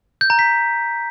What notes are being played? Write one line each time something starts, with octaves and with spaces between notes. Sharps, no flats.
G6
A#5
B6